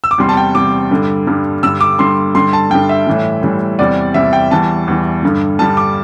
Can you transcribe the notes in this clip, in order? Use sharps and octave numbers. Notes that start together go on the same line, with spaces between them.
E6
D6
E2 C3 G3 C6
A5
G5
E2 C3 G3 D6
G2 D3 G3
G2 D3 G3
G2 D3 G3 E6
D6
G2 D3 G3 C6
G2 D3 G3 C6
A5
G2 D3 G3 G5
E5
A2 E3 G3
A2 E3 G3
E2 C3 E3 G3 D5
E2 C3 E3 G3 E5
G5
E2 E3 G3 A5
E2 E3 G3
G2 D3 G3
G2 D3 G3 A5
D6